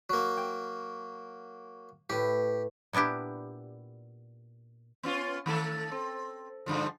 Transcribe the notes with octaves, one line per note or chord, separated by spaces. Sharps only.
F#3 A#3
G5
A2 G4 B4
A#2 B3 D4 E4 G4
B3 C#4 F4
D#3 A3 A4
C4
G2 D3 F3